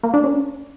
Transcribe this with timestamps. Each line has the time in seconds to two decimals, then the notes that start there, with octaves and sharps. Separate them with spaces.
0.03 A#3
0.14 D4
0.24 C#4